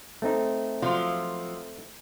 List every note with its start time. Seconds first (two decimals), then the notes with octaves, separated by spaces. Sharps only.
0.22 A3 C4 D#4
0.82 F3 F#3 F4